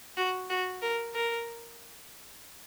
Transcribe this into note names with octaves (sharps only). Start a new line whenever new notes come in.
F#4
F#4
A#4
A#4